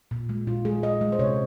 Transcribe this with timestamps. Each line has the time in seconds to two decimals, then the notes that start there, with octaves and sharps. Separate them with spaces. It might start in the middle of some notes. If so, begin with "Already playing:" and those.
0.11 A#2
0.29 G#3
0.47 A#2 F4
0.65 G#3 G#4
0.83 A#2 D#5
1.01 G#3
1.12 C5
1.19 C3 C#5